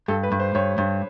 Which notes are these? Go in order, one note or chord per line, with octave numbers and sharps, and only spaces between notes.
G2 A4
B4
G2
C5
G2 C#5
G2